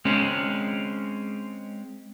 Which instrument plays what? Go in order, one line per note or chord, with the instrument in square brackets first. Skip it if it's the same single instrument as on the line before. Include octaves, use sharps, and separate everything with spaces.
[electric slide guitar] G#3 C4 C#4